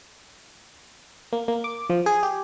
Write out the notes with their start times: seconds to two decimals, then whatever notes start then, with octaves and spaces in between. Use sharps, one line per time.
1.33 A#3
1.48 A#3
1.64 D6
1.90 F3
2.06 G#4
2.23 G4